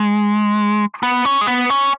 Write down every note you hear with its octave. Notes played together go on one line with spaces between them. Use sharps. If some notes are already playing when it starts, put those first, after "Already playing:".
Already playing: G#3
B3
C#4
G#3
B3
C#4